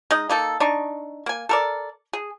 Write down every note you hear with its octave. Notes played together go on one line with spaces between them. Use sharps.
G#3 D#4 D#5
A#3 D#4 A4
D4 D#4 C#6
A#3 G#5
A4 A#4 D5
G#4